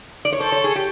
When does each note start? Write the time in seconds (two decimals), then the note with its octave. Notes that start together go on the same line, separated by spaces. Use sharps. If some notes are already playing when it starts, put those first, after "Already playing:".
0.25 D5
0.32 C#5
0.40 A4 C5
0.52 C#5
0.64 G#4
0.76 G4